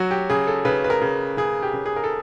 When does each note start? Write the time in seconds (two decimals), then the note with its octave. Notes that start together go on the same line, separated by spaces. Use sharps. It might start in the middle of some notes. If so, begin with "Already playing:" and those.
Already playing: F#3 F#4
0.11 G4
0.30 C#3 G#4
0.47 A4
0.65 C#3 B4
0.84 B4
0.90 A#4
1.02 C#3
1.37 C#3 G#4
1.63 G4
1.73 C#3
1.86 G#4
1.96 A#4
2.04 A4